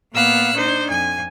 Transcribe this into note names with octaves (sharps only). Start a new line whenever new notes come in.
A#2 A#3 B3 F5 E6 F#6
D4 D#4 C5
F2 G#5